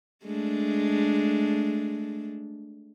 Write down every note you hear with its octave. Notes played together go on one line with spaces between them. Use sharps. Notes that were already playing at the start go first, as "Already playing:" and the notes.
G#3 A3 D4